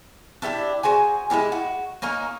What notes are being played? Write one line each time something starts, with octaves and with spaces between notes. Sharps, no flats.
D4 E4 G4 E5
F#4 G#4 C5 G#5
G#3 B3 E4 G4
F#4
A#3 C#4 D#4 A#4